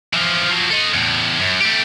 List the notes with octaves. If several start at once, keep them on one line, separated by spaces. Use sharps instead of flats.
E3 F3
F3 F#3
A4 D#5
E2 A2
F#2
A3 G4